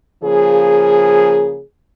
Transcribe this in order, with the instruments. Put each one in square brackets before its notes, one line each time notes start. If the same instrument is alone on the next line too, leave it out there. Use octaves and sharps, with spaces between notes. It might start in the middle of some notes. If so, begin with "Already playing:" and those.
[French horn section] C#3 F3 A#3 G#4